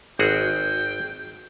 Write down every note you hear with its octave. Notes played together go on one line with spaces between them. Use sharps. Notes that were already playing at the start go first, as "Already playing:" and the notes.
G#1 F#4 G#4 G5